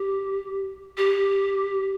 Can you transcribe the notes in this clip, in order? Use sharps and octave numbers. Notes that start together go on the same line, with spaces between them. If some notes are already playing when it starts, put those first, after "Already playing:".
Already playing: G4
G4